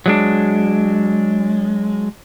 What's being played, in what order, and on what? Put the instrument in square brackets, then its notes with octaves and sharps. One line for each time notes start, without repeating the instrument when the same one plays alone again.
[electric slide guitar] F#3 G#3 D4